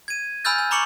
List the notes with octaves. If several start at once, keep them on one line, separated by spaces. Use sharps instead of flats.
G#6 D#7
G#5 B5 E6 F6 G6 A6
G#5
A#5 B5 C#6 D6 C#7 F#7